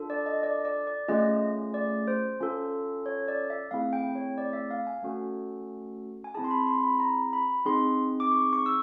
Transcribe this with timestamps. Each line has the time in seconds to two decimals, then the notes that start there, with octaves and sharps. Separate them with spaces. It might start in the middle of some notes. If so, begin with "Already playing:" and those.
Already playing: D4 F4 A4
0.10 D5
0.26 D#5
0.43 D5
0.65 D5
0.87 D5
1.08 A3 C#4 F4 G#4 D#5
1.74 D5
2.08 C5
2.41 C#4 F4 A4
3.06 C#5
3.28 D5
3.50 E5
3.71 A3 C4 E4 G#4 F5
3.93 G5
4.15 C#5
4.38 D5
4.53 E5
4.71 F5
4.87 G#5
5.03 A3 C#4 F#4 A4
6.24 G#5
6.34 C4 E4 G#4 A5
6.44 C6
6.51 B5
6.67 C6
6.84 B5
7.00 A#5
7.33 B5
7.65 C4 D#4 G#4 C6
8.20 D6
8.32 C#6
8.53 C#6
8.66 E6